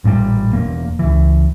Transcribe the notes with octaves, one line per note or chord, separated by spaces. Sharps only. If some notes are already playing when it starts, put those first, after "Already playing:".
A1 A#2 C#3 G3
E1 E2 A#3
C#2 E3